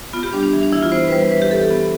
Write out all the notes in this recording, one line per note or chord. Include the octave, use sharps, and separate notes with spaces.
B3 F4
G4
G3 D4
D4
E3
D4
E3 E4
F4
B3 C5
B4
G3 C5
E3 B4
G4
E3 A4
B3